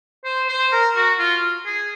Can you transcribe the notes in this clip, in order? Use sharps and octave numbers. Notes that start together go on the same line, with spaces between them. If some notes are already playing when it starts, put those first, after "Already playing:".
C5
C5
A#4
F#4
F4
G#4